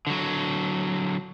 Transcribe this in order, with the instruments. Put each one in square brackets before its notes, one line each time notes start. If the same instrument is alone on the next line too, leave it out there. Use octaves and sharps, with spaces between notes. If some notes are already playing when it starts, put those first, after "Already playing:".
[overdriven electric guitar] D3 F#3